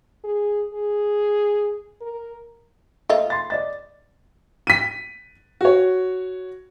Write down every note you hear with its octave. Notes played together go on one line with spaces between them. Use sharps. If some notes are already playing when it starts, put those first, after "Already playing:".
G#4
G#4
A#4
A3 A#3 F4 D#5
C6 A6
D5 D#5 A6
B6 D#7
F#4 C#5